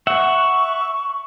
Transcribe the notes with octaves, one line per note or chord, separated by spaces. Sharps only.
E5 F#5 C#6